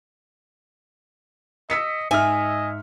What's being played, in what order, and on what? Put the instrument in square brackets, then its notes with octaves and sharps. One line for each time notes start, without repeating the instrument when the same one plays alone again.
[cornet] D#5 [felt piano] E6 B6 C#7
[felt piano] G#2 [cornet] D#5 [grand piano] E5 F6 [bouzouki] G#5